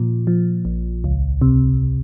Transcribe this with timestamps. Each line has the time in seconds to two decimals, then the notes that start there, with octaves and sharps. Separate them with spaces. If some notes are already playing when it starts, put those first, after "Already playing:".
Already playing: A#2 F3
0.27 F3
0.65 A#1
1.04 C#2
1.41 C3